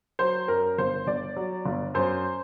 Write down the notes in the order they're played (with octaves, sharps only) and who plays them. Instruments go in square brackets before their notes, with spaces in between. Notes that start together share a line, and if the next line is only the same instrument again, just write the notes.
[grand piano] F#3 [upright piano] C5
[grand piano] F#2 [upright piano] A#4
[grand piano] G1 [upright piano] C5
[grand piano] G1 [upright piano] D5
[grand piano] F#3
G1
[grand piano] F#2 [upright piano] C5